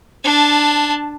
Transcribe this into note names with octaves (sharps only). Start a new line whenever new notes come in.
D4 A5